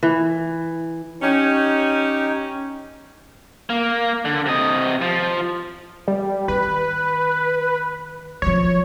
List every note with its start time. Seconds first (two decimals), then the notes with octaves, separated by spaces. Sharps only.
0.03 E3
1.22 C#4 D#4 G4
3.70 A#3
4.25 D3
4.46 C3 D#5
5.02 F3
6.08 G3
6.48 D#3 B4
8.42 F3 F#3 C#5